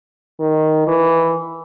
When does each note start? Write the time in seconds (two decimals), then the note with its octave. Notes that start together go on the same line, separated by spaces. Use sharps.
0.40 D#3
0.87 E3